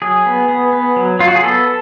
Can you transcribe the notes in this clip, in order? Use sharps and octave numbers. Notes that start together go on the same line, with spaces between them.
F#3 G#4
B3
B3
B3
F#3
F#3 F4
F#4
G#4
B3 A4